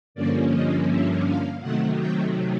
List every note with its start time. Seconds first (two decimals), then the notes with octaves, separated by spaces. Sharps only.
0.15 G2 D3 F3 A#3 C#4 D5
0.52 D#5
0.87 E5
1.25 F5
1.61 C3 D#3 F#3 A3 F#5
1.97 G5